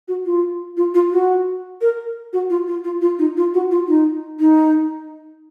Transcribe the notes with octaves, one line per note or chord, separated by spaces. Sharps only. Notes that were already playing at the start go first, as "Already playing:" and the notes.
F#4
F4
F4
F4
F#4
A#4
F#4
F4
F4
F4
F4
D#4
F4
F#4
F4
D#4
D#4